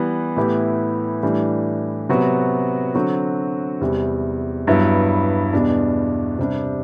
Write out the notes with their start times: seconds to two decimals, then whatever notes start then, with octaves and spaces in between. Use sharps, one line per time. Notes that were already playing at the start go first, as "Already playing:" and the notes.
Already playing: E3 G3 B3
0.36 A2 E3 B3 E4 G4
1.23 A2 E3 G3 D4
2.09 C3 F#3 B3 F#4
2.95 D3 F#3 C4 F#4
3.81 E2 C3 G3 C4
4.67 G2 F#3 B3 E4
5.53 E2 B2 G3 D4
6.39 C3 G3 D4